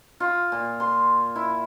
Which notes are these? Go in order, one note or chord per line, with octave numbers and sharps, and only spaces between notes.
F4
A#2
C6
E4